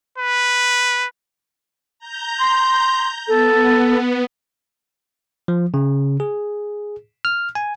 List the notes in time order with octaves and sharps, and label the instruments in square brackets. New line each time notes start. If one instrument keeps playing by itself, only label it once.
[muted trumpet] B4
[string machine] A#5 G6
[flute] C6
[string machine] B3 [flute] A4
[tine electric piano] F3
C#3
G#4
F6
G#5